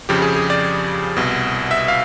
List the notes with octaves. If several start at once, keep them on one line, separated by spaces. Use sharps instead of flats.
F2 C#3 F3 G4
G#4
G#4
D5
C2 B2
E5
F5